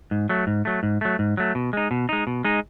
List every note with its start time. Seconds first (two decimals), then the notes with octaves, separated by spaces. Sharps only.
0.11 G#2
0.29 F#3 A3
0.47 G#2
0.65 F#3 A3
0.83 G#2
1.01 F#3 A3
1.19 G#2
1.37 F#3 A3
1.55 B2
1.73 G#3 D#4
1.91 B2
2.09 G#3 D#4
2.27 B2
2.44 G#3 D#4